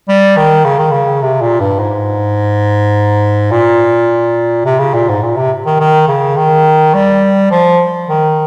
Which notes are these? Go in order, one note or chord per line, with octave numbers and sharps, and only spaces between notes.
G3
D#3
C#3
D#3
C#3
C3
A#2
G2
G#2
A#2
C3
C#3
A#2
G#2
A#2
C3
D#3
D#3
C#3
D#3
G3
F3
D#3